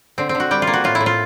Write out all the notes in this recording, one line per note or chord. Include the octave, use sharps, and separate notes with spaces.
D3 C4
C4
D3
F#4
G3 G4
F4
A#3
F#4
A2 F4
E4
A2
F4